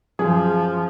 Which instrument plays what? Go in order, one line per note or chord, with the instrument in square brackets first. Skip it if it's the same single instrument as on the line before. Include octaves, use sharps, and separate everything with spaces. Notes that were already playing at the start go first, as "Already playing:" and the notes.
[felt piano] F#2 G#4 [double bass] F3